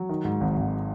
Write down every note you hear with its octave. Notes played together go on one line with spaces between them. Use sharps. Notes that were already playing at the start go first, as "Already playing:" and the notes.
Already playing: F#3
D#3
G#2
G#1
G#1